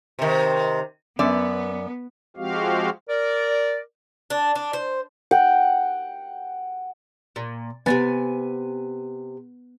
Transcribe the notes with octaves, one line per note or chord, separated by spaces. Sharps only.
C3 D#3
F#2 B3 D5
F3 G#3 C4 F#4 G4 F5
A#4 D5
D4
D4
C5
F#5 G5
A#2
C3 B3 C4 G#5 A6